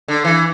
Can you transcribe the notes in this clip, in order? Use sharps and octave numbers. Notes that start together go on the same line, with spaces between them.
D3
E3